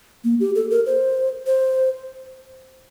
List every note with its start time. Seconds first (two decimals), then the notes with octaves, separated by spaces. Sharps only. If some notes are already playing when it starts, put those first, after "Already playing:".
0.24 A#3
0.40 G4
0.55 A4
0.70 A#4
0.86 C5
1.47 C5